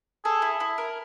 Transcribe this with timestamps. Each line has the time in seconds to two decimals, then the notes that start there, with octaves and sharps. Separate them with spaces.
0.25 G#4 A4
0.42 E4
0.60 E4
0.78 A#4